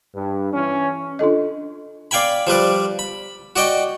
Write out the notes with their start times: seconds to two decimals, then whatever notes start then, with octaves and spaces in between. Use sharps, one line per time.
0.15 G2
0.54 E3 C#4
1.19 D4 F4 A4 D#5
2.11 D5 F5 G5 G#5 B5
2.47 F3 G3 B4 D5
2.99 B5
3.56 F#4 D5 D#5 G5